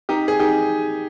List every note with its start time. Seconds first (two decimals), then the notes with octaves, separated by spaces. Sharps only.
0.09 D#4 G4
0.28 G#4
0.40 D#4 G4